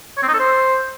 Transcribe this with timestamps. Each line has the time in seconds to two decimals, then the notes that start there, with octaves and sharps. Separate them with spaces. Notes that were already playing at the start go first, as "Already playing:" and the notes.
0.17 C#5
0.23 C4
0.28 D#4
0.34 A4
0.39 C5